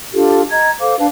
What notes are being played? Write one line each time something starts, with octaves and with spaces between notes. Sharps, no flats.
D4 F4 G4 A4
D#5 A#5 G#6
A4 C5 F5 D6
D4 B4 F5 A5